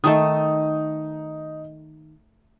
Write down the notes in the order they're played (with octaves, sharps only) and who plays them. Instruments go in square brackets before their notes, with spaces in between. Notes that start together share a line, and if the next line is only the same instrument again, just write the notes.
[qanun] D#3 A3 A4 [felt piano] D#4 D#6